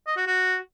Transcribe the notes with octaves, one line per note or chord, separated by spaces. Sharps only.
D#5
F#4
F#4